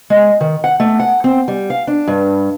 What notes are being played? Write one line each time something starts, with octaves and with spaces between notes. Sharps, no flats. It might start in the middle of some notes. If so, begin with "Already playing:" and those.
G#3
D#3
F#5
A3
F#5
C4
G3
F5
D4
G2